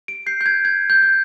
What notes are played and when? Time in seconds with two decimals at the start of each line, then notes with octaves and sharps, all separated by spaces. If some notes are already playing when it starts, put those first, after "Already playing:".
0.08 D7
0.26 G6 C7
0.41 G6
0.46 G#6
0.65 G6 G#6
0.90 G6
1.03 G6